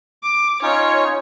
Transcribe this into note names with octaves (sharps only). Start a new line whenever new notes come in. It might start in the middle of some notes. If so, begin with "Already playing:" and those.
D6
C#4 D#4 F4 C#5